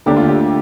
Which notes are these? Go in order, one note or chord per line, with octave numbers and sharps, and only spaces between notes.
D2 D3 A#3 D4 G4
F4
G4